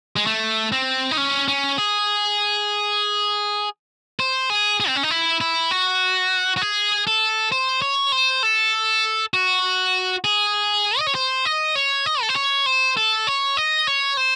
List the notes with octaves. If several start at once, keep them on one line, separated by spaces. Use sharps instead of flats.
G#3
A3
C4
D#4
C#4
C#4
G#4
C5
G#4
G#4
C4
C#4
D#4
E4
E4
F#4
F#4
G#4
A4
C5
C#5
C5
A4
F#4
G#4
D#5
C#5
C5
D#5
C#5
D#5
A4
C5
C#5
C5
A4
C#5
D#5
C#5
C5